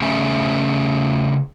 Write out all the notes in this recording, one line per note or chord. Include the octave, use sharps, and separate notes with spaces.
C#3 A3 C#4 G#4 E5 G#5